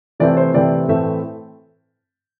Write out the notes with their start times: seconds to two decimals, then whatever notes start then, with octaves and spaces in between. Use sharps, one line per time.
0.20 C3 E3 A3 C4 D5
0.37 C5
0.54 C3 E3 A3 C4 D5
0.88 A2 E3 A3 C4 E5